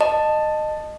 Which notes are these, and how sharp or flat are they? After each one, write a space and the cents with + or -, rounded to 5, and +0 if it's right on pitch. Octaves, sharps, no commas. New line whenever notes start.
D#5 -20 A5 +5